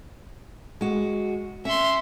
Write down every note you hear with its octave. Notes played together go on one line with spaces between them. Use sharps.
G#3 F#4
C#4 E5 C6